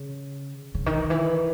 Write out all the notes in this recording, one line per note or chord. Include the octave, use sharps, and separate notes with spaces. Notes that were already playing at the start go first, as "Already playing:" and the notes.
Already playing: C#3
C#3
D#3
E3